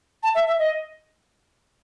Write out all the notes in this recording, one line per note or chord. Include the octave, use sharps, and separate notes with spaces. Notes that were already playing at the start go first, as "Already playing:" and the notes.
A5
E5
E5
D#5